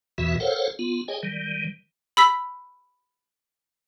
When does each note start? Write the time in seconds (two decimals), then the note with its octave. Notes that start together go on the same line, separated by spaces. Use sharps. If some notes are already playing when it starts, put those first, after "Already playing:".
0.18 E2 B2 E3 F#4 E5
0.40 A4 A#4 C5 C#5 F5 F#5
0.79 B3 F4
1.08 G#4 C#5 D#5 G5 G#5
1.23 D#3 G3
2.17 B5 E6 B6